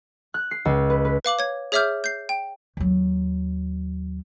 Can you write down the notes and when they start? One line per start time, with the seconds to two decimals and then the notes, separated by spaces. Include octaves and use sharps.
0.34 F#6
0.51 C7
0.65 C#2
0.90 B4
1.05 B4
1.25 B4 F5 D6 F#7
1.39 C#5 G#6
1.72 G#4 C#5 E5 D6 F6 G6
2.04 G6 C7
2.29 G5
2.77 D#2 F#3